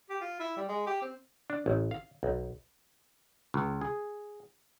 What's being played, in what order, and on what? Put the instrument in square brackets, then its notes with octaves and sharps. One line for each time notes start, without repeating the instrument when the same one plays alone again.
[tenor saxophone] G4
F4
E4
G3
G#3
G4
C4
[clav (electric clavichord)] D4
A1
F5
B1
C#2
G#4